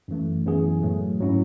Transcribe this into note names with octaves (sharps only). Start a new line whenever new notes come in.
F#2 E3 A3
F#2 E3 B3 E4 G#4
A2 F#3 A3
G#2 F#3 C#4 E4